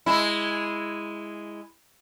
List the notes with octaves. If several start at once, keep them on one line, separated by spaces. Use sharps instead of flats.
G#3 E4